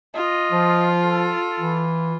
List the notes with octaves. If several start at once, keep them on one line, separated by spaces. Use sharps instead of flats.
F4 D#5
F3
A4
E3